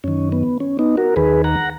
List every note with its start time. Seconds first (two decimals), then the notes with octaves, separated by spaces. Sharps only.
0.04 F#2 D#3 C#4
0.32 B3
0.60 C#4
0.79 B3 D#4
0.97 F#4 A#4
1.16 D#2 D#3 G#4 B4
1.44 F#5 A#5